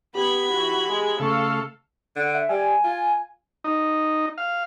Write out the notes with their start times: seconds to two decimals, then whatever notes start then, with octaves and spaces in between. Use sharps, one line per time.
0.15 B3 G4 B5 G#6
0.51 E3 E4 F#4
0.90 G#3 G#4
1.20 C#3 A3 A4 F5 C#6
2.16 D3 F#5
2.34 E5
2.49 G3 G#5
2.84 F4
3.64 D#4
4.38 F5